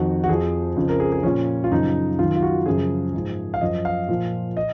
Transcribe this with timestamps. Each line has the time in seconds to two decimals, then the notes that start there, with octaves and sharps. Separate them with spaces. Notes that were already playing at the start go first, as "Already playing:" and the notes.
Already playing: F2 D#3 F#4
0.24 F#4
0.29 F2 F3 G#4
0.76 F2 C#3 F3
0.89 A#4
1.00 G#4
1.12 G#4
1.23 A#2 F3 C#4
1.64 F4
1.71 F#2 C#3 F3 D#4
2.19 F#2 D#3 F4
2.36 F4
2.42 F#4
2.66 F#2 C#3 F3 G#4
3.14 G#2 F3
3.54 F5
3.61 F#2 F3 D#5
3.85 F5
4.08 A#2 F3
4.57 D#5